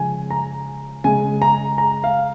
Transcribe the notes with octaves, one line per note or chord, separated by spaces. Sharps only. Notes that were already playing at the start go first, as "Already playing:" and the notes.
Already playing: C#3 F3 G#3 G#5
A#5
C#3 G#3 G#5
A#5
A#5
F5